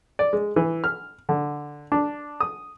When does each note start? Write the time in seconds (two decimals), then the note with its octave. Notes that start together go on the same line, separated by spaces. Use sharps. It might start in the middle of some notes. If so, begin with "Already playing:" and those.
0.19 D5
0.33 G#3
0.56 E3
0.84 F6
1.29 D3
1.92 D4
2.40 D#6